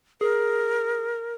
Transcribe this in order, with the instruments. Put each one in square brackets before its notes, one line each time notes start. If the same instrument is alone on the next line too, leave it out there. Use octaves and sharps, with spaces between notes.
[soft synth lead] G#4 [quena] A#4